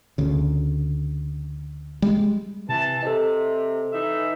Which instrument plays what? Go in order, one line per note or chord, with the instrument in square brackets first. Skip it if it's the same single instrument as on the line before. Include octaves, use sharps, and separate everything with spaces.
[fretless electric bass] D2 C#3
G3 G#3
[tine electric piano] C3 [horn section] E3 A5
[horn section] C3 [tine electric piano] A4 D#5
[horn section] E3 D#4 E5